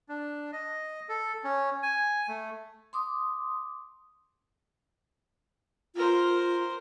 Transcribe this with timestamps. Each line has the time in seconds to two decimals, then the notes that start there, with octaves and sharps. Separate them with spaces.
0.09 D4
0.53 D#5
1.09 A4
1.44 C#4
1.83 G#5
2.28 A3
2.93 C6 D6 D#6
5.96 F4 A#4 C5